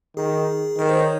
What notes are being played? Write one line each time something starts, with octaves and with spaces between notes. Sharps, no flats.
D#3 G#4
D#3 A#4
C5
C#5